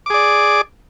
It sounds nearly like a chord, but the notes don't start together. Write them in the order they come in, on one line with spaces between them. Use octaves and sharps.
D6 G#4 D5